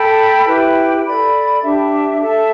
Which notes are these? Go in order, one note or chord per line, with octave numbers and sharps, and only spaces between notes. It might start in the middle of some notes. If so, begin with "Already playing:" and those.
Already playing: A4 G5 B5
E4 G4 B4 G5
A4 D5 B5
D4 G4 E5
A4 E5 A5